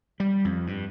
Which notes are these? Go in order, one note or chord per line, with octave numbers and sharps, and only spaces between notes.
G3
F2
G2